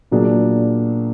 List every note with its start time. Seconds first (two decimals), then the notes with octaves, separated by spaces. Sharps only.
0.11 A#2 F#3 A#3 D4 G#4